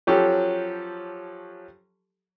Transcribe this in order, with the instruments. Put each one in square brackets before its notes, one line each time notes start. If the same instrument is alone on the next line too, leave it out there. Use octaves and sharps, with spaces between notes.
[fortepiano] F3 F#3 C#4 G4 A4